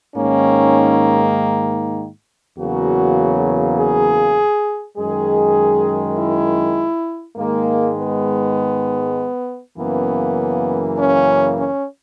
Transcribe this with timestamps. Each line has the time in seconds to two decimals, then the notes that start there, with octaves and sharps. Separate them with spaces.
0.15 G#2 D#3 A#3 C#4
2.56 E2 C#3 F#3 A#3 F#4
3.76 G#4
4.96 F#2 D#3 G#3 G#4
6.16 E4
7.36 G#2 D#3 G#3 A#3
7.97 B3
9.77 F#2 C#3 E3 A#3 B3
10.97 C#4
11.57 C#4